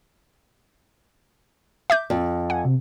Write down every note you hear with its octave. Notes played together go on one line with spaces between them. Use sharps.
E5 D6 G6
F2
F#5 G#5
C3